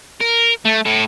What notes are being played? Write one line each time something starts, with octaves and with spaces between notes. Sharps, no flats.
A#4
A3
A2 A4